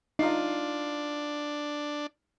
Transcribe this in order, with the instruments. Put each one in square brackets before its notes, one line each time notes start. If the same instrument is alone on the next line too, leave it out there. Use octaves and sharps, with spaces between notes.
[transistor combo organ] D4 [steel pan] D#4 [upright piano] F4 C7